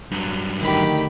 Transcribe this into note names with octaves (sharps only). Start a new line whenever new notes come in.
G2 F#3
D2 D3 D#3 G4 B5